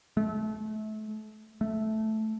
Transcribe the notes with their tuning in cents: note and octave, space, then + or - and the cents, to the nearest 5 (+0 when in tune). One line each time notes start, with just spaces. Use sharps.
A3 -30
A3 -10